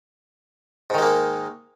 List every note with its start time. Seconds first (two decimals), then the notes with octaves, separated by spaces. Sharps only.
0.90 G#2
0.94 D#3
0.98 G#3
1.02 A#3